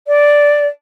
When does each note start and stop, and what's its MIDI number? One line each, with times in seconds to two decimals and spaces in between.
0.07 0.67 74